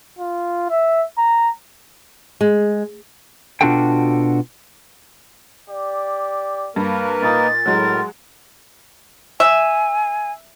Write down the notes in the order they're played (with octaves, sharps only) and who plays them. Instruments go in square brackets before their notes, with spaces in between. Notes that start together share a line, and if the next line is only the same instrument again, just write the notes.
[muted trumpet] F4
E5
A#5
[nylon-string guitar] G#3
[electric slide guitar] B2 D4 F4 F#4 A4 G5
[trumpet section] G4 D5
[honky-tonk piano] G2 [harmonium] A#3 A#4 B4
[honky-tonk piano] A#2 [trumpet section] D#4 [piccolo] A6
[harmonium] A2 A#4 [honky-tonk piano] F#3 G#3 [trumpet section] F#5 C6
[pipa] E5 [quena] G#5